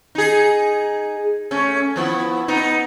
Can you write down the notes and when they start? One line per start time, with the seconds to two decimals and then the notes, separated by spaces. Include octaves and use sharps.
0.15 D#4 G#4
1.51 A3 C#4
1.96 F3 B3 E4
2.48 B3 D#4